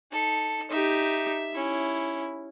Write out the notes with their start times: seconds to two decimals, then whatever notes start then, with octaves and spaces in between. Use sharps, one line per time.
0.11 D#4 A4
0.71 D#4 G4 E5
1.54 C#4 E4